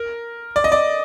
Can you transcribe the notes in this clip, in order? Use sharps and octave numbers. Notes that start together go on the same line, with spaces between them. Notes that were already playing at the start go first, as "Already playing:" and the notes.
Already playing: A#4
D5
D#5
D5